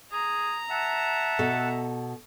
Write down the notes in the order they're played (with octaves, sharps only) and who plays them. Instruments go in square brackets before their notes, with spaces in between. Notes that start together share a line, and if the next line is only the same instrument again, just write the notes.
[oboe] G#4 [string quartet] A#5
[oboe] E5 [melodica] F#5 A5
[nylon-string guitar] B2 A4